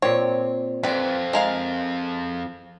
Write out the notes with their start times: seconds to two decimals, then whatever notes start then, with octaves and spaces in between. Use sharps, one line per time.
0.02 A#2 C4 C#5
0.83 F2 C4 B4 D5
1.33 G#3 A#4 F5